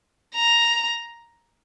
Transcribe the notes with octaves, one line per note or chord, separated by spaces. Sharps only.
A#5